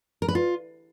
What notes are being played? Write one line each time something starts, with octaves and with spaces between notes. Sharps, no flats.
A#4
B4
F4